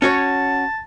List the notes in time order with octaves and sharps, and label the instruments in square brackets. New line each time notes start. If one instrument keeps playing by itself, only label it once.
[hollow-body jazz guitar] C#4 F#4 C#5 [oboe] A5